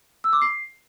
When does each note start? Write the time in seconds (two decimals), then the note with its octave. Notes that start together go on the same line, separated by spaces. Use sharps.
0.24 E6
0.33 D6
0.42 C7